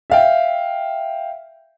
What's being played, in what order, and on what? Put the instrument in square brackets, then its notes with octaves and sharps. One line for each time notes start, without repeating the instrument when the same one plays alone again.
[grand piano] E5 F5 G5